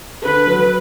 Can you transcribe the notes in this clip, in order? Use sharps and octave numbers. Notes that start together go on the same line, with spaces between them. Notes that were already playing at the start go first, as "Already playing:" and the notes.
D3 B4
F#3